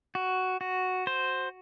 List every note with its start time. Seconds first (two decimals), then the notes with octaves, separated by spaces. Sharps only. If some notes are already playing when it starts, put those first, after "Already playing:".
0.15 F#4
0.61 F#4
1.07 C5